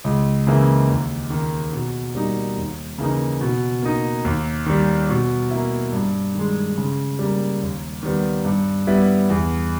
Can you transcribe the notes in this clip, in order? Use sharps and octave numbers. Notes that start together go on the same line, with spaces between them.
C#2
C#3 E3 A#3 E4
D#2
D#3 A#3
B2
G3 A#3 D#4
D#2
C#3 E3 A#3 D#4
B2
A#3 D#4
D#2
D#3 G3
B2
A#3 E4
G2
D#3 G#3
C#3
G3 A#3
D#2
D#3 G3 B3
G2
G3 B3 E4
E2